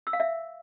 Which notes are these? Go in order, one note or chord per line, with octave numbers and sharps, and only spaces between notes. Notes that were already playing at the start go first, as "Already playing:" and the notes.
E6
F5
E5